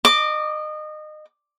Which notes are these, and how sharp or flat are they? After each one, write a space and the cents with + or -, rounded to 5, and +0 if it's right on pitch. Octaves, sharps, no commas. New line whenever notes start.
D#5 -25 D6 +0